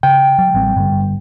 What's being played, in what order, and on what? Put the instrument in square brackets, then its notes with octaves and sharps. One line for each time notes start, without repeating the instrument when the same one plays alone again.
[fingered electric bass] C#3 [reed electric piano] G5
[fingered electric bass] F#3
A1 G3 C4
G2 D3 G3